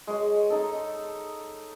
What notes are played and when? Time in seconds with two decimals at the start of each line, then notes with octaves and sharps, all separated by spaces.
0.07 G#3 C#5
0.50 D#4 A4